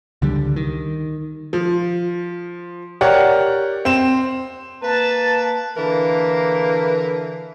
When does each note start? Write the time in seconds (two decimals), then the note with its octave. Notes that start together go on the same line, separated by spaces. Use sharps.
0.22 C#2 D3 G3
0.56 D#3
1.53 F3
3.01 G4 A#4 C#5 D5 F#5
3.85 C4 E7
4.83 A#3 B4 A5
5.77 D3 E3 A#3 A#4